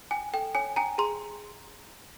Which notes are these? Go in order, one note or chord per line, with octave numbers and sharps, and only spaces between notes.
G5 G#5
A4 G5
C#5 G#5
G5 G#5 A#5
G#4 A#5 C6